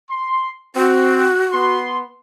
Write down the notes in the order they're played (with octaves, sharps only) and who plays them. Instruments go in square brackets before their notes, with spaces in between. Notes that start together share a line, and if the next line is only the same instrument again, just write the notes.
[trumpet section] C6
[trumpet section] C4 [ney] F#4
[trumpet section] B3 C6